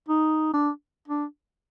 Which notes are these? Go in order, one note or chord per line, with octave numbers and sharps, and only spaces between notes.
D#4
D4
D4